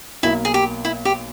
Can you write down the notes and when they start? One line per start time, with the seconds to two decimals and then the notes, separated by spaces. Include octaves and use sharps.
0.23 B1 B2 A#3 E4
0.45 G#4
0.54 G4
0.85 E4
1.05 G4